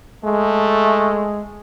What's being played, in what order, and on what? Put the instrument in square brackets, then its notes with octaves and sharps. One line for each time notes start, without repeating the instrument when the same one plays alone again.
[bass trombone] G#3 [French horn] A3